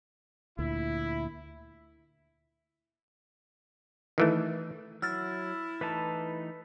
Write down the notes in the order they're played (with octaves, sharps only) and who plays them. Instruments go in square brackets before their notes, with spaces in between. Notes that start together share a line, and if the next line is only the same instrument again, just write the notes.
[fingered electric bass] D2 A#2 [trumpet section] E4
[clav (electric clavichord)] D#3 E3 A3
[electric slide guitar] F#3 [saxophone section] E4 [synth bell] E6 F6 A6
[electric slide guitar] E3 A3 D#4 [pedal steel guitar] B4 A5